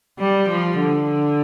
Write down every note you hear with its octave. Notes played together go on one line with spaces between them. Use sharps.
G3
F3
D3